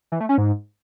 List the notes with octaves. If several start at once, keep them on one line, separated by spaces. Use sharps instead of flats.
E3
A3
C#4
G#2